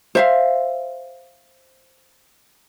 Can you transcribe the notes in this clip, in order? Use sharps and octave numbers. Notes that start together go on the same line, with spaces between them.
C5 E5 F5